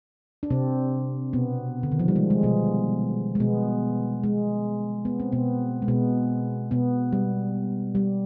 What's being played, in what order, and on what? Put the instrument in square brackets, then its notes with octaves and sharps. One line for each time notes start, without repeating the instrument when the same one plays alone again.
[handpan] D4
C3 C4
B2 B3
D3
D#3
F3
G3
G#3
G#3
B2 B3
G#3
B2 B3
G#3
B3
C4
B2 B3
G#3
B2 B3
B2 B3
G3
G3